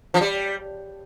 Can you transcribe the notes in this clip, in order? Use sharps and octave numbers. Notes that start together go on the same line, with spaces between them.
F3
G3